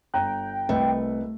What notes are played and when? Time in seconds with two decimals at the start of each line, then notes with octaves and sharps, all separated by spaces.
0.14 G1 G5 A#5 F#6
0.69 C2 A3 B4 D#5